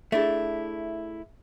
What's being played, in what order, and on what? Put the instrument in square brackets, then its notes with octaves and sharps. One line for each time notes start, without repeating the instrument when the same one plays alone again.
[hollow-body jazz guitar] A3 D4 E4 [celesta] G#4 E5